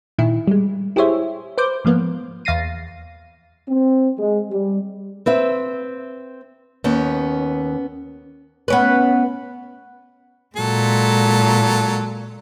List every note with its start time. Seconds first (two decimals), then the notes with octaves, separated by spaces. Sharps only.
0.18 A#2 D#3 E4
0.47 G3 G#3
0.96 E4 G4 G#4 C5 C#5 E5
1.58 B4 C5 D6 G6
1.85 G#2 F3 A#3 B3
2.45 E2 F5 A6 A#6 C7 D#7
3.68 C4
4.19 G#3
4.50 G3
5.26 C4 B4 E5
6.84 D#2 B3 C#4
8.68 B3 C#4 B4
10.56 A#2 F#3 G#3 A4